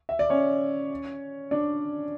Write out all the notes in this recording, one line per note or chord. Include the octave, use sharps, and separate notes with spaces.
E5
D5
C#4 C#5
D4 D5